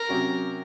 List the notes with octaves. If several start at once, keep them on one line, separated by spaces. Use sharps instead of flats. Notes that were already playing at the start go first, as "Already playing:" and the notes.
Already playing: A#4
C3 F#3 C#4 F#4